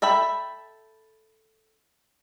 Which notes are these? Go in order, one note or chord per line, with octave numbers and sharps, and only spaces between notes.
A4 E5 G5 B5